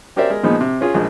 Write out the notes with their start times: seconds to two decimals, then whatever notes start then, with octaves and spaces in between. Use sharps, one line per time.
0.16 C#4 G4 A#4 C5 D5 E5
0.30 G#3 A#4
0.43 A#2 F3 G#3 B3 D#4
0.61 C3
0.81 C#4 F4 G#4
0.94 A#1 F3 G#3